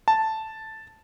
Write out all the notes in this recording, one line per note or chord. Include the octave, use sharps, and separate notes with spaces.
A5